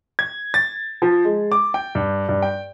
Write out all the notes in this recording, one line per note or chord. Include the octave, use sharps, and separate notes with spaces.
G#6
A6
F3
G#3
D6
G5
G2
G2
G5